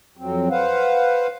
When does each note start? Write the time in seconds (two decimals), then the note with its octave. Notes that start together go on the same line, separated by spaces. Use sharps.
0.17 F2 F#3 C4
0.51 B4 C5 F5 F#5